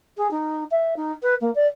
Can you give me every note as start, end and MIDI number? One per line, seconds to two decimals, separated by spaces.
0.17 0.28 68
0.31 0.64 63
0.71 0.94 76
0.96 1.12 63
1.23 1.35 71
1.41 1.53 58
1.55 1.67 74